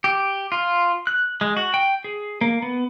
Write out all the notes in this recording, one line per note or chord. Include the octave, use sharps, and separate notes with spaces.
G4
F4
F#6
G#3
F#4
G5
G#4
A#3
B3